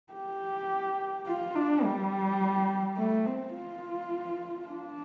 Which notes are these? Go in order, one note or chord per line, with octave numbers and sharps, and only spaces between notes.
G4
F4
D4
G3
A3
C4
F4
D4